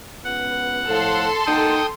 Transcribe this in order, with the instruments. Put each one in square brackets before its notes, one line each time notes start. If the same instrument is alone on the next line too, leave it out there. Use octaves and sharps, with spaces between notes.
[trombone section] C#2 B3 [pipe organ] F#5
[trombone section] A2 F3 [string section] A4 C6
[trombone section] A#3 D#4 F#4 [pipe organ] G5 D#6